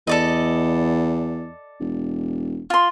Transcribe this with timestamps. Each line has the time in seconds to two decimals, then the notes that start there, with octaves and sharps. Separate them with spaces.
0.07 E2 A4 D5 D#5
1.81 E1
2.70 F4 C6